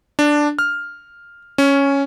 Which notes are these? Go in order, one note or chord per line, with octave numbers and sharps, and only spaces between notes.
D4
F6
C#4